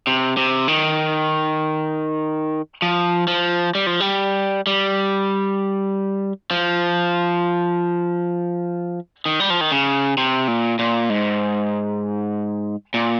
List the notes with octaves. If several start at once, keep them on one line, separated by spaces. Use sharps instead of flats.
C3
C3
D#3
F3
F3
G3
F3
G3
G3
F3
D#3
G3
F3
D#3
C#3
C3
A#2
A#2
G#2
A#2